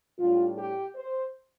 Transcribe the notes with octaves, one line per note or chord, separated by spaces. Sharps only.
A2 G3 D4 F4
G4
C5